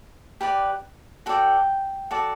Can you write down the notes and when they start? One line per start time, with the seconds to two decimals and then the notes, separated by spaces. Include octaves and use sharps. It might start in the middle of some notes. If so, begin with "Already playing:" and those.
0.41 G4 B4 D5
1.26 F#4 A4 D5 G5
2.11 F#4 A4 D5